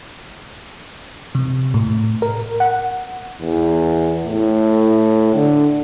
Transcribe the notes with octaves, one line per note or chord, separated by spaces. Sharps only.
C3
A2
A#4
F#5
E2
A2
D3